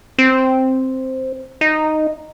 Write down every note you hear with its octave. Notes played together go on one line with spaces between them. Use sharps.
C4
D#4